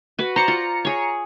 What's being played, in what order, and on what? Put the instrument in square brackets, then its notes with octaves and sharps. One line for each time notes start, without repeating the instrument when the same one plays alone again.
[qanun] F#4 B4
[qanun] C5 D5 [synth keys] A#5 C#7
[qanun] F4
G#4 C#5